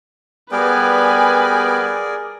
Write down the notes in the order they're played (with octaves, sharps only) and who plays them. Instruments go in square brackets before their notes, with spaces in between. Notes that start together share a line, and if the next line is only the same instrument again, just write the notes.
[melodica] G3 B3 G5 [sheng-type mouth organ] G#4 A#4 D5 [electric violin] B4 G#5